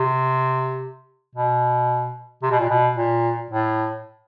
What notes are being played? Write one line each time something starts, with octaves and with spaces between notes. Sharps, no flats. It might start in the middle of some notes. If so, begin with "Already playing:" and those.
Already playing: C3
B2
C3
B2
A#2
B2
A#2
A2